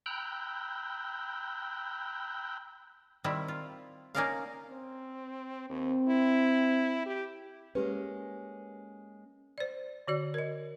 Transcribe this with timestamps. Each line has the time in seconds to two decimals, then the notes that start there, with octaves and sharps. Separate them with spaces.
0.06 G5 A#5 B5 E6 F#6 G6
3.24 D#3 G3 C4 E4
3.48 F4
4.15 A#3 C#4 D#4 A#4 D5 F5
4.70 C4
5.70 D#2 C4
6.08 E4
7.06 G4
7.75 G#3 A#3 C#4 G4 B4
9.58 C5 D5
10.08 D3 F#4 D5
10.34 A#4 D#5